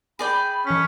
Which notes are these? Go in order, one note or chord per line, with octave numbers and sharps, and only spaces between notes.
G#4 D5 G5 B5
E3 C#4 B6